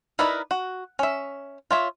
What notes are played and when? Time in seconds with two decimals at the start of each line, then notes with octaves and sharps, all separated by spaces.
0.19 D#4 E4 A#4 B4 D5
0.51 F#4
0.99 C#4 E5
1.71 F4 C#5 E5